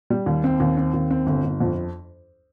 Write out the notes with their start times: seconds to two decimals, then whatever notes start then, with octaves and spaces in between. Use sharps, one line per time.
0.10 G3
0.26 D#2
0.44 C4
0.60 D#2
0.77 C4
0.94 D#2
1.10 C4
1.27 G1
1.44 G1
1.60 F2